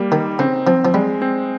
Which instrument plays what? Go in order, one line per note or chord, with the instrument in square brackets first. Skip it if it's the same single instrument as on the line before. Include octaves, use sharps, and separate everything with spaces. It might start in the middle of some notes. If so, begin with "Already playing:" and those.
Already playing: [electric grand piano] G3 A#3
[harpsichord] D#3 [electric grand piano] D#4
[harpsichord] C#3 [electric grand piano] C4
[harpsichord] F3 [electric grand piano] C4
[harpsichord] F3
[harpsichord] G3 [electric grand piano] G#3
[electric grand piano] C4